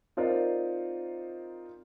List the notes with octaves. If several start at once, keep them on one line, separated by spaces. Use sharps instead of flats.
C4 D#4 F4 A#4 C5 D5